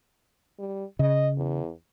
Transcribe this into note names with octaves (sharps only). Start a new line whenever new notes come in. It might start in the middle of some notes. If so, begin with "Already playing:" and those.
G3
C#3 D#5
E2